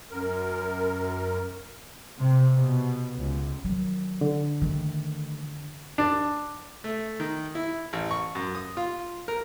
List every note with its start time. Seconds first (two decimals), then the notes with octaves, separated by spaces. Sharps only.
0.11 F#2 A#4
2.18 C3
2.56 B2
3.15 C#2
3.65 D#3 F#3
4.21 D3
4.62 D#3 A3
5.98 D4
6.84 A3
7.20 D#3
7.55 E4
7.93 A1
8.11 C#6
8.35 F#2
8.55 D#6
8.77 F4
9.28 A#4